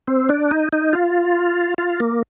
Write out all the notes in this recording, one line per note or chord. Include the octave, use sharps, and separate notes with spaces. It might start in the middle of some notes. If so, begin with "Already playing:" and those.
C4
D4
D#4
D#4
F4
F4
A#3